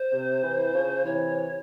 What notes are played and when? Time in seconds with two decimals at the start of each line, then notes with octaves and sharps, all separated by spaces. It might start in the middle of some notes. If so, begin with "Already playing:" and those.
Already playing: C5
0.12 C3
0.43 C3 E3
0.73 C#3 F3
1.04 C3 E3 C#5